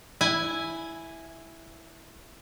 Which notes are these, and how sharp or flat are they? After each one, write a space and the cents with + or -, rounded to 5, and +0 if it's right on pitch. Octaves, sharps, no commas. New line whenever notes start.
E4 +0 G#5 +0